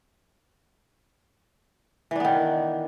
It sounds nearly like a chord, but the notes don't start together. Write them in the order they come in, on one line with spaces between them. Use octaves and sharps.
E3 D4 B3 D#3